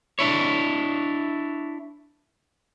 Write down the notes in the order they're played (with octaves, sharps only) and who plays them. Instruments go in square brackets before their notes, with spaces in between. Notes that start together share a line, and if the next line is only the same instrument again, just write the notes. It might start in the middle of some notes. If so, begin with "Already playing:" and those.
[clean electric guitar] D4 E4 C#5